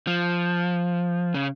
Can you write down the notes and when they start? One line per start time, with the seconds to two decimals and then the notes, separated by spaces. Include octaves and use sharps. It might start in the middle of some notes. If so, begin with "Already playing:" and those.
0.07 F3
1.34 C#3